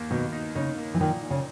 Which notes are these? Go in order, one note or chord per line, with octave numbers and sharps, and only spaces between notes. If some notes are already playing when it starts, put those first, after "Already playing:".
Already playing: D#2 D#3 A#3
B2 D#3
D#4
C#3 D#4
A#3
E3
A#2 D#3
A#2
C#3